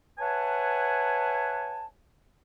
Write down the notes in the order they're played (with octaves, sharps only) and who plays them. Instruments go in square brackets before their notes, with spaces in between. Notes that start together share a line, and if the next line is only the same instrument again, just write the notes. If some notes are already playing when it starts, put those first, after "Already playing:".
[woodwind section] B4 C#5 E5 F#5 G#5 A5